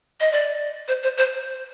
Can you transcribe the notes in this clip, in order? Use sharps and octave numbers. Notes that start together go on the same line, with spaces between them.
D#5
D5
C5
C5
C5